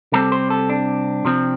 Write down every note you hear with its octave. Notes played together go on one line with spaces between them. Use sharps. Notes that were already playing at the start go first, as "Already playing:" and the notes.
C3 G3 C4 A4
C5
A4
D4
C3 F3 C4